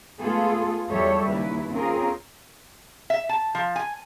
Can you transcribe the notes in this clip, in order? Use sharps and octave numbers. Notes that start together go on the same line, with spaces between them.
G#3 A3 B3 F4 G#4 A4
E2 F3 G3 A4 C#5 E5
D#2 C#3 E4 B4
C4 C#4 F4 G#4 A#4
E5
A5
F3
G#5